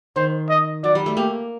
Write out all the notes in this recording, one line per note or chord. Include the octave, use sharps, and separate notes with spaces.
D#3 C5
D#5
F#3 D5
G3
A3
A#3 G4